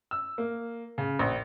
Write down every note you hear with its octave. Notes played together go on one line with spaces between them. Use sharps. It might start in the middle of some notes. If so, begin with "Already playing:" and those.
E6
A#3
C#3
A#1